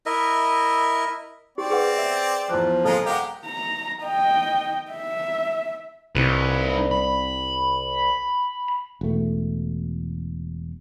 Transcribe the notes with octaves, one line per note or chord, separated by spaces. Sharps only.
E4 A#4 D#5 E5
C4 G4 D5
G#4 B4 F#5
E5
E2 F3 F#6
D#1 G#3 F4 A4 A5 A#5
G#3 G4 A#4 F5 F#5
A#5
D#5 G5
E5
C2 D#4 B4
B5
E1 A3